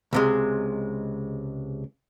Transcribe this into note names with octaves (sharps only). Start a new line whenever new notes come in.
C#2 C3 G#3